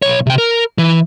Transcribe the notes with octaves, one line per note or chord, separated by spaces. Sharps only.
B1 C#5
C3 G5
A#4
E3